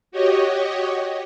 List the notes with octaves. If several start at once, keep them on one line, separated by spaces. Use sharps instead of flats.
F#4 G4 C#5 D#5